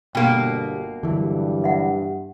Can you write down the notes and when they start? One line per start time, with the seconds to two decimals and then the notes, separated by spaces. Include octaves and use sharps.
0.15 G1 B2 A#3 G5
1.03 G2 D3 E3 F#3
1.64 E5 F#5